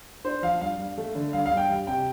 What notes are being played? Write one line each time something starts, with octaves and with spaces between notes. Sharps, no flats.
D4 C5
F3 F5
G2 F5
G2
A3
D3
G2 F5
F5
G2
G5
G3
C3 G5